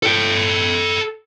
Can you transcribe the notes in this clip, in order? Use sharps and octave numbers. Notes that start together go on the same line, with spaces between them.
A4 G5